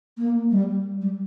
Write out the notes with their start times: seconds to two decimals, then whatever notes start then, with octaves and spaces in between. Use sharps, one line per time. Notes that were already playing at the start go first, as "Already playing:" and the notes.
0.18 A#3
0.51 G3
1.01 G3